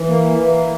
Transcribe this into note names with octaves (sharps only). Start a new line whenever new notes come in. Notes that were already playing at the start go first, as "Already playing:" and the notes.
Already playing: E3
A#3
E3